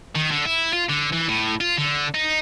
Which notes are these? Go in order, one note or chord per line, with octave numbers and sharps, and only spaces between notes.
D#3
D3
E4
F4
D3
E3
A2
F4
D3
D#4